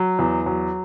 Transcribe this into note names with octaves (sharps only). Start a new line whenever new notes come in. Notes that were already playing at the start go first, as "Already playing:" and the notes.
Already playing: F#3
E2
F#3